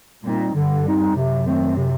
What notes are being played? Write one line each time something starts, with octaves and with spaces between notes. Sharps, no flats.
A#2 G3 C4 D#4
G2 D3
G3 C4 D#4
F#2 C3
D#3 A3 C4
C3